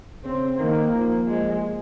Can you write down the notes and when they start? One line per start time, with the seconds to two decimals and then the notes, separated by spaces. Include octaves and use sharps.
0.24 C#3 C4
0.59 D#3 A#3
0.93 F3
1.27 F3 G#3